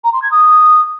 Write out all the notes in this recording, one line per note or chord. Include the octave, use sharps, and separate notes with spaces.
A#5
C6
G#6
D#6